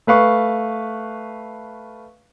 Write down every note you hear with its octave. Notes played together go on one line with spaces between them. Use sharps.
A3 B4 F5 C#6